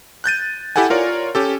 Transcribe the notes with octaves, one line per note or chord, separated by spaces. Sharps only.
F#6 G6 A6 D#7
E4 G4 A4 F#5 G#5
F4 A#4 C#5 D5
C#4 G4 A4